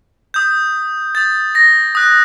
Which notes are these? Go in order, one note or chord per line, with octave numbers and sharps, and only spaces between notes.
D#6 G6
D#6 G6 A6
A#6
D#6 F#6